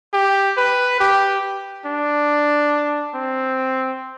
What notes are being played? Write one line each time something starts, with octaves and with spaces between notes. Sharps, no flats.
G4
B4
G4
D4
C4